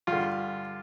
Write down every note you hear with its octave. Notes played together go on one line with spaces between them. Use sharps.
G2 D3 F4